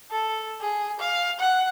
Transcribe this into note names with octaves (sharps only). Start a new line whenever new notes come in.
A4
G#4
F5
F#5